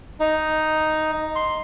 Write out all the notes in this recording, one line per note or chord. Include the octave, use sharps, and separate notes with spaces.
D#4
C6